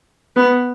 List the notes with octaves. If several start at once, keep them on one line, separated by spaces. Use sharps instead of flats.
B3